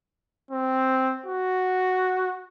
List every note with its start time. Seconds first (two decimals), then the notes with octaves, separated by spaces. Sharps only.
0.51 C4
1.26 F#4